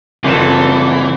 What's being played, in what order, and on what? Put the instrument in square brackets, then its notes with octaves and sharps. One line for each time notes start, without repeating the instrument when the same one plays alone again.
[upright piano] F#1 E7 [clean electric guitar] G2 C3 F3 [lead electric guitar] E3 [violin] F#4 A4